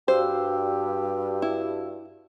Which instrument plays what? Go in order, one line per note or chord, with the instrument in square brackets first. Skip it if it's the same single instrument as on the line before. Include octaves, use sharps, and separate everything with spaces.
[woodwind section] G2 [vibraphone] F#4 F5 E6 [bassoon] G4 [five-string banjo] C5
[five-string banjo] E4